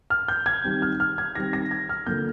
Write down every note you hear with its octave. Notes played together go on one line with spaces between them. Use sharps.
F6
G6
G#6
D#3 G3 C4
F6
F6
G#6
D#3 G3 C4 A#6
A#6
G#6
F6
D3 F3 A#3 G6